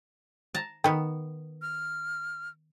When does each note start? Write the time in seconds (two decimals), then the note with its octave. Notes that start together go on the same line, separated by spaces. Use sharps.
0.55 A5 A#5
0.84 D#3 B3 G5
1.62 F6